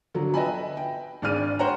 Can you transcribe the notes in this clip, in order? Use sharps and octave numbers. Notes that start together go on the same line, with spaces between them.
D3 F3 F#3
B4 D#5 E5 G5 G#5 B5
G5
G#1 D4 G#4 D5 F6 D#7
C5 C#5 F#5 G5 A#5